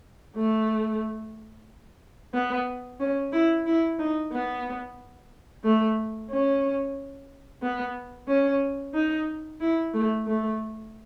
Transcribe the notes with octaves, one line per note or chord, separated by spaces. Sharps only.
A3
B3
C#4
E4
E4
D#4
B3
A3
C#4
B3
C#4
D#4
E4
A3
A3